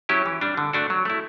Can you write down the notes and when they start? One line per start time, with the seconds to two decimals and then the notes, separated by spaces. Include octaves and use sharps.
0.09 F#3 C#4 E4 G4
0.26 E3
0.41 G3 D4
0.57 D3
0.73 A3 D4 F#4
0.90 F#3
1.05 A3 E4